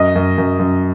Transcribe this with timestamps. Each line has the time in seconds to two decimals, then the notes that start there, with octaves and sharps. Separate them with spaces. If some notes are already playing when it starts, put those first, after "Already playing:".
Already playing: F#2 D#5
0.16 F#2
0.38 F#2
0.60 F#2